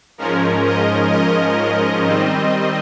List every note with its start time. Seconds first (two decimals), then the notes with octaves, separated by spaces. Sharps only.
0.18 G#2 F3 G#3 C#4 A#4
0.65 D#5
1.11 D#5
2.06 D#3 G3 C4